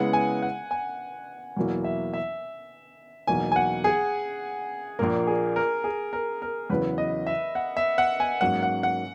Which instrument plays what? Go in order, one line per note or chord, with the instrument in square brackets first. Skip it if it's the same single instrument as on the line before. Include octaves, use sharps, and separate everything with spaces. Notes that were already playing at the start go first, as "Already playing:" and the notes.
Already playing: [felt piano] C#3 G#3 B3 E4 G#4 [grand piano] F#5
[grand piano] G#5
F#5
G#5
[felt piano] E2 B2 F#3 A#3 E4
[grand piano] E5
E5
[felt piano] E2 B2 F#3 A#3 D#4 [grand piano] G#5
[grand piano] G#5
F#5
G#4
[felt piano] A#1 A#2 A#3 [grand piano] A#4
[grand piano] G#4
A#4
G#4
A#4
A#4
[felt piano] E2 C#3 F#3 B3 E4 [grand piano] B4
[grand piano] D#5
E5
F#5
E5
F#5
G#5
[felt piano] G#2 F#3 A#3 C#4 [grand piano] F#5
[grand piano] F#5
F#5